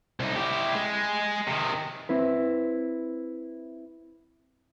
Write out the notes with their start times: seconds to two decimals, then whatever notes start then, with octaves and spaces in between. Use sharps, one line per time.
0.20 C2 D#4
0.36 E4 G4
0.74 G#3
1.48 C3 D#3
2.09 C4 E4 B4